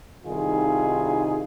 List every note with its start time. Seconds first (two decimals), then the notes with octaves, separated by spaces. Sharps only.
0.24 C2 D#3 D#4 F4 G#4